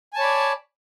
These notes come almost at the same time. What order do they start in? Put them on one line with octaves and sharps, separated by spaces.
G#5 A5 C#5 B5 D5